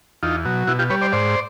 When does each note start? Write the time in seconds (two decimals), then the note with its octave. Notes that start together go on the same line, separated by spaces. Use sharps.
0.23 E2 D#4 F4
0.45 B2 F#3
0.67 B2 E4 F#4
0.79 F4 G4
0.90 G3 B4 C#5
1.01 C5 D5
1.12 G#2 C5 D5